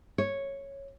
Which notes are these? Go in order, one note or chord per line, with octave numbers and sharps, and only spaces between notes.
C#5